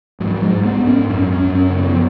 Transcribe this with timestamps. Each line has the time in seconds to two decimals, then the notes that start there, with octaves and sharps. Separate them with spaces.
0.20 G#2 F#3
0.27 F3
0.34 F#3
0.42 G#3
0.50 G#2
0.65 B3
0.80 G#2
0.87 C#4
1.10 F#2 C#4
1.32 C#4
1.40 F#2
1.55 C#4
1.70 C#3
1.77 B3
1.92 F3